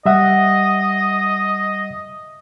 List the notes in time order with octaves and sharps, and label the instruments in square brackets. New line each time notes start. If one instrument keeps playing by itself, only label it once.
[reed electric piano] G3 E5 F#5 [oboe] D#5